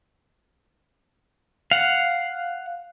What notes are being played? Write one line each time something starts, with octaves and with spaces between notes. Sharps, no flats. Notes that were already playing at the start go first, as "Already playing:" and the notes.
F5 F#5